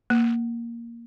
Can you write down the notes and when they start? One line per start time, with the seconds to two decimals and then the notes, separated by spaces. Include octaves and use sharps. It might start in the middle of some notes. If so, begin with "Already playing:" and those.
0.10 A#3